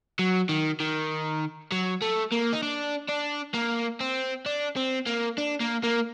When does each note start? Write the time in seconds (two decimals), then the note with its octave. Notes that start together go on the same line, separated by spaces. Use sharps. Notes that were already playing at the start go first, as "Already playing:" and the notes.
0.19 F#3
0.49 D#3
0.80 D#3
1.72 F#3
2.02 A3
2.32 A#3
2.53 D#4
2.63 D4
3.09 D4
3.54 A#3
4.01 C4
4.46 D4
4.77 C4
5.07 A#3
5.38 D4
5.60 A#3
5.83 A#3